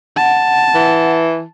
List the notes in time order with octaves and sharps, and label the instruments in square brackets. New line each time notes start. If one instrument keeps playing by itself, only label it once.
[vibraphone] F#5 [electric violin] A5
[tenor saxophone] E3